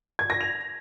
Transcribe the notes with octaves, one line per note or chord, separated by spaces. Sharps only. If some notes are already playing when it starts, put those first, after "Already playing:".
G#6
A#6
F7